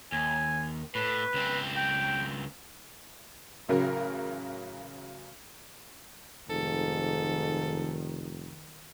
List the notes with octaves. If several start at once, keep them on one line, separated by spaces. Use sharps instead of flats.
D#2 G#5
A2 B4
C#2 C4
G5
A1 C#3 F#3 A#4
F1 G#2 D#3 A4